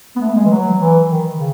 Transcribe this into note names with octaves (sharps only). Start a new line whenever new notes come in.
B3
A3
G#3
E3
F#3
E3
D#3
C#3